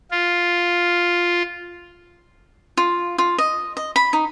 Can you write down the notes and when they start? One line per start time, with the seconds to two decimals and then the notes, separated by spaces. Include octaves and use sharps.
0.11 F4
2.77 F4
3.18 F4
3.38 D#5
3.77 D#5
3.96 B5
4.13 D#4